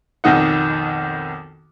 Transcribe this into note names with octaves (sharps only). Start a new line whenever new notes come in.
B1 F2 D#3 D#4 F#5